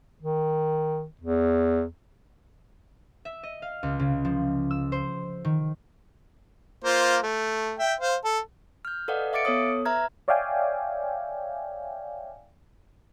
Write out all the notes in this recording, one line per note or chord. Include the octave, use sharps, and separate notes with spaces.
D#3
E2
E5
D#5
F5
C#2
C#3
F3
E6
C5
D#3
A#3 F4 C5
A3
E5 G5
C5 F5
A4
F6 G6
A4 B4 D5 D#5 F5 F#5
E5 F5 D6 A6 C#7 D7
B3 A4 C#5 D#6
B4 E5 A#5 F6 G#6
C#5 D5 E5 F5 G5 G#5